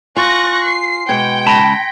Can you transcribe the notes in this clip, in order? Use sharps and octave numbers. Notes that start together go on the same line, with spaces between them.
F4 G#5 C6 C#6 F#6 A#6
C7
B2 G#3 G5 G#6 C#7
C#2 A5 B5 A#6 B6